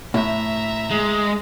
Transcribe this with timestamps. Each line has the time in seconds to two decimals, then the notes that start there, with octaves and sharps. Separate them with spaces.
0.14 A2 E5 A#5
0.91 G#3